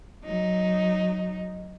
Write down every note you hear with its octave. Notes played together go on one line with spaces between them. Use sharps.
F#3 D#4